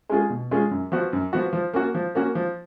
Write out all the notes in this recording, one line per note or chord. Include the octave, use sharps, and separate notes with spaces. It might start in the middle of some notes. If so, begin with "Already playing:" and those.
G#3 C#4 F4 G#4
B2
G#3 C#4 F4 G#4
F#2
F3 B3 F#4
F#2
F3 B3 F#4
F3
A#3 C#4 F#4
F3
A#3 C#4 F#4
F3